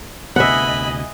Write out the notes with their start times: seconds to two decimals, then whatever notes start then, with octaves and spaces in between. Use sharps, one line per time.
0.36 D2 C3 B3 D#5 E5 F#5 G#5 B5